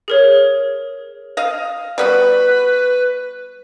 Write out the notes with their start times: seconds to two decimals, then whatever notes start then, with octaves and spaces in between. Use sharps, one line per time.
0.08 G#4 A#4 C#5
1.37 D#5 F5
1.98 G3 B3 F#4 B4